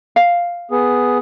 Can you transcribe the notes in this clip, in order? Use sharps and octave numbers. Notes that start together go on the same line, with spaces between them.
F5
B3 G#4